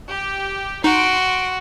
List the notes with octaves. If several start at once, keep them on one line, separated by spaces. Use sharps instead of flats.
G4
D#4 F#4 C6 D7